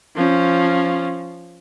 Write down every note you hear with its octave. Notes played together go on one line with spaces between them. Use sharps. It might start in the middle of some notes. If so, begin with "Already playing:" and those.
F3 C#4